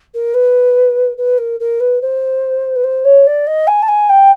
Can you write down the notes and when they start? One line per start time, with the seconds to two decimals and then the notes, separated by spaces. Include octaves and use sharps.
0.14 A#4
0.34 B4
1.17 B4
1.38 A#4
1.60 A#4
1.80 B4
2.01 C5
2.75 B4
2.84 C5
3.04 C#5
3.26 D5
3.47 D#5
3.67 G#5
3.82 A5
3.88 G#5
4.09 G5